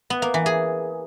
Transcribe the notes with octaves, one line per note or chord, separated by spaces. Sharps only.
B3
A#3
E3
G#4